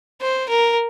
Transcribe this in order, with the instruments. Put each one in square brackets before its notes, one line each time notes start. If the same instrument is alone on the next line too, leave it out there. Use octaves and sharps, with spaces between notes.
[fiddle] C5
A#4